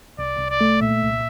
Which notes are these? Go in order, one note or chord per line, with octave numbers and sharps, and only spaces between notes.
C2 D5
C2
D5
A3
A#2 E5
C2